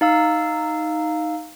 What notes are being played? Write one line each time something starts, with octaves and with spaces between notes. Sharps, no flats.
D#4 F5 E6